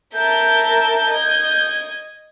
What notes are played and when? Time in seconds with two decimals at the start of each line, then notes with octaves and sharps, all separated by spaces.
0.14 A#4 E5 A5 G6
1.09 D#5 G#6